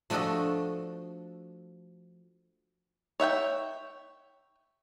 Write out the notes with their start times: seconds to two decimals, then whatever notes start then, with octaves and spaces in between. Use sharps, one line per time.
0.10 F3 A3 D4 F#4 A4 D#5
3.20 C#5 E5 F#5 G5